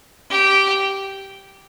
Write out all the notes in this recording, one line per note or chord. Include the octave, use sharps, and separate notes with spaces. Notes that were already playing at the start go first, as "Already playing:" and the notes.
G4